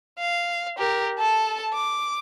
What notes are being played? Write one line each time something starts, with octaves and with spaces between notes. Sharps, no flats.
F5
G4 A#4
A4 A5
D6